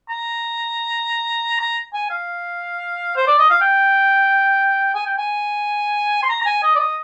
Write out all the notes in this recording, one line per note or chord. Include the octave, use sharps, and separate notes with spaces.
A#5
A#5
G#5
F5
C5
D5
D#5
F5
G5
G#5
G5
G#5
C6
A#5
A#5
G#5
D#5
D5
D#5